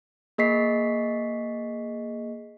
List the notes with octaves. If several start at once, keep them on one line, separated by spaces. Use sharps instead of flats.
A#3 G#4 D#5 C#6 B6 C7